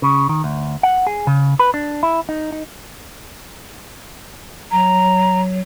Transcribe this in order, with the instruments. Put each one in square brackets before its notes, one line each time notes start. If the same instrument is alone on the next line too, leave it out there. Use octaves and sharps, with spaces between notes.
[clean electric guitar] C#3
D#3
D2
F#5
G#4
C#3
B4
D4
E4
D#4
D#4
[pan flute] F#3 [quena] A#5